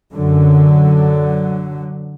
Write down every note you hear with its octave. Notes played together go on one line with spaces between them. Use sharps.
F#2 D3 F#3